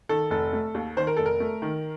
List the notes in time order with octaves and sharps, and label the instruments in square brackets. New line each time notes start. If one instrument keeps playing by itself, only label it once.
[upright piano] D#3 A4
F1 A4
A3
D#2
D#3 C5
A#4
F1 A4
A#4
A3
D#3